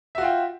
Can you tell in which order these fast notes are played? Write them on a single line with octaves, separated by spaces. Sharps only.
E5 F#4 F4 G5